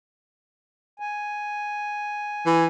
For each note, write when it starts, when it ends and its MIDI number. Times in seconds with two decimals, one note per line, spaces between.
1.00 2.67 80
2.46 2.67 52